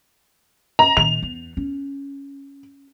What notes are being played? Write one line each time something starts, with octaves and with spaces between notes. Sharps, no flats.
A#5
A#2 D#3 F7
E2
C#4